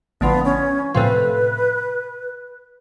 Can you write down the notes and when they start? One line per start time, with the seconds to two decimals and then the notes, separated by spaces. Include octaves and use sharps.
0.21 A1 D3 F3 B3
0.45 C#4
0.95 A2 C3 F3 B4